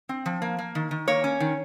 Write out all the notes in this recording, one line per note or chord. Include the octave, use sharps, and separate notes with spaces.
C4
F3
A#3
A#3
D#3
D#3
A#3 C#5
C#4
D#3